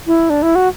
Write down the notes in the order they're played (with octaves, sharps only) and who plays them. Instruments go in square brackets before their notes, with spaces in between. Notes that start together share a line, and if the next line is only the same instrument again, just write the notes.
[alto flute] E4
D4
E4
F#4